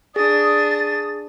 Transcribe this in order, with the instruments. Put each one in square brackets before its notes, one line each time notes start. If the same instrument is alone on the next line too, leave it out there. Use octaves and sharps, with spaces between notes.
[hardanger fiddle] D4 [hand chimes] G#4 [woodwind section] D#6 [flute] A6